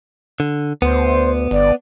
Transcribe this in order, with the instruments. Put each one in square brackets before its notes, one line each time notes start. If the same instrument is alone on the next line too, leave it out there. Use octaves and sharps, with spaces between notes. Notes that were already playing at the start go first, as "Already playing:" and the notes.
[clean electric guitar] D3
[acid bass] D2 [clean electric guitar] B3 [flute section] C5
[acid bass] G1 [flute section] D5